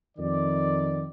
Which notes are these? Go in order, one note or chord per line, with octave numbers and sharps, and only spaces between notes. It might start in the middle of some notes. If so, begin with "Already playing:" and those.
F2 D#3 D5